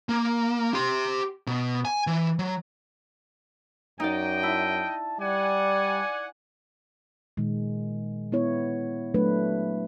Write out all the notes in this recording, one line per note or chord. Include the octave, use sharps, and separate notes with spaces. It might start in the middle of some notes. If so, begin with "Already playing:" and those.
A#3
G4 C6
B2
G#5
E3
F#3
F#2 D#4 D5 D#5 G5
E4 A5
G3 D5 F#5 G#5
A#2 D#3 G#3
B3 E4 C#5
F#3 A3 D4 B4